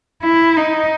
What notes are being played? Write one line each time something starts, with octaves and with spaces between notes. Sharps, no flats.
E4
D#4